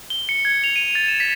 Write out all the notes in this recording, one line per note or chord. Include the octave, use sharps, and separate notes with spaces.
G7
C#7
G#6
F7
D#7
A6
E7
B6